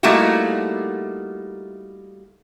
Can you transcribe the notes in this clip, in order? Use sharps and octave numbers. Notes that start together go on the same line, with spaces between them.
G3 A3 A#3 D#4 E4 F#4